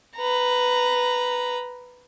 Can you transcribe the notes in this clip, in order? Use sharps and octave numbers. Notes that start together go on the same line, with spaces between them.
B4 A#5